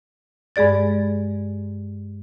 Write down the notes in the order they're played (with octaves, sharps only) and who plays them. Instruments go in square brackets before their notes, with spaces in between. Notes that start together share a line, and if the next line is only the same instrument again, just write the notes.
[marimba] G2 G#3 G#4 D5 A6